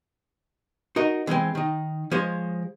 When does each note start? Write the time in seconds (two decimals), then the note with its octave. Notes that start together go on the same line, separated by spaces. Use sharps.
0.96 D#4 F#4 A#4 D#5
1.27 D3 E3 G#3 C4
1.55 D#3 D#4
2.11 F3 G#3 C5 C#5